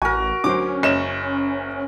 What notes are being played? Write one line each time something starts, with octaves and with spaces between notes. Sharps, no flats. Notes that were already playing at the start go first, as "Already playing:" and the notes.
A1 F#4 A#4 G#5
D2 F#3 C#4 C5 D6
F#1 C#5 D#5 E7